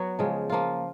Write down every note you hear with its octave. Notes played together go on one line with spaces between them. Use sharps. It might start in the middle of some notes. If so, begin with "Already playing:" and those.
Already playing: F#3 B3 F#4
C#3 F3 G#3
F3 A#3 F4